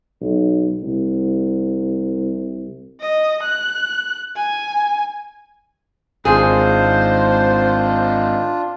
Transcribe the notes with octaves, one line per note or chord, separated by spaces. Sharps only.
B1
C2
D#5
F#6
G#5
G#1 D4 F4 G#4 C5